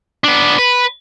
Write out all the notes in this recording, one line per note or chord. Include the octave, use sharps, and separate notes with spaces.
B3 D4
B4